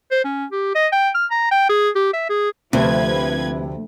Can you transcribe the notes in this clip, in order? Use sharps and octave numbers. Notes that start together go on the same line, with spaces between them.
C5
C#4
G4
D#5
G5
F6
A#5
G5
G#4
G4
E5
G#4
D2 C3 F3 B4 G#6